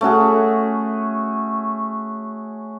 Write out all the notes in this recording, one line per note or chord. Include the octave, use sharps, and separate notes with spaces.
A3 C#4 F#4 G#4